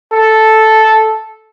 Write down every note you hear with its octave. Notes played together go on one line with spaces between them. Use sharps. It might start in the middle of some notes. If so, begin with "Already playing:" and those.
A4